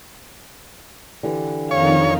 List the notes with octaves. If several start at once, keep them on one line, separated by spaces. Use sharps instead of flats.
D3 E3 G4
F2 D#3 D#4 C#5 F5